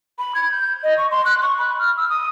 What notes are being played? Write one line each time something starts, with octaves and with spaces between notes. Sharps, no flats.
B5
G#6
G6
D#5
C#6
C6
F#6
C#6
B5
F6
E6
D#6